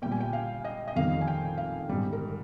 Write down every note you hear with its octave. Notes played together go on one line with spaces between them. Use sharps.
A#2 G3 G5
G#5
G5
F5
D#5
D#5
F2 D#3 G3 F5
G#5
G5
F5
G#2 G3
A#4